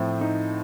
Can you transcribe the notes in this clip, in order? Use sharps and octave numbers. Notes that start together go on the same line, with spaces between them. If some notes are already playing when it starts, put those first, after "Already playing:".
Already playing: A2 F3 C4
D#4